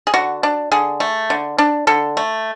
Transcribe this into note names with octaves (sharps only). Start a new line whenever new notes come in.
G#4
D3 F#4
D4
D3 G#4
A3
D3
D4
D3 A4
A3